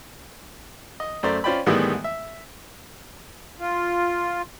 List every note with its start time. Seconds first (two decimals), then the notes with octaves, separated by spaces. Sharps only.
1.00 D#5
1.23 F#2 A3 C5 D5 A#5
1.44 C#4 F4 C5 D5 G5 B5
1.66 A2 D#3 E3 G3 G#3 B3
2.04 E5
3.60 F4